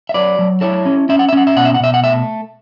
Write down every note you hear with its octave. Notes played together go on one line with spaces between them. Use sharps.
E5
F#3 B4 D5
F#3
E4 A4 C#5
C#4
C#4 E5
F#5
E5
C#4 F#5
E5
B2 F#5
E5
F#5
B2 E5
F#5
A3 E5